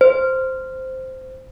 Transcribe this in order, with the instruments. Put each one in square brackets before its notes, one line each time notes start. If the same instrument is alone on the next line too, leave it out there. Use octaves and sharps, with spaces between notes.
[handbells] C5